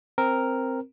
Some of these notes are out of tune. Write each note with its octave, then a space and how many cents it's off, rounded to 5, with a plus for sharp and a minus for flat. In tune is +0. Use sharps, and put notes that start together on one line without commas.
C4 +0 A#4 +0